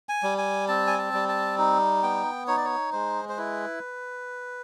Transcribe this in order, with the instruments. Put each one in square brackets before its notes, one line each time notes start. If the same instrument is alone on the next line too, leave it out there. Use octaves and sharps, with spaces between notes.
[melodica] G#5
G3
G#5
C4 A5
G#5
A5
G3
A5
D#4
B3 G5
D#4 C#5
D5
C#5
G#3 C5
C5
E4 B4